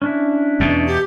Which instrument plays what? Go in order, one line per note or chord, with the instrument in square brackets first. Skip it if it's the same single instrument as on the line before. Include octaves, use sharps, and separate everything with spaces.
[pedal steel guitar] C#4 D4 E4
[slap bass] E2 B2
[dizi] G4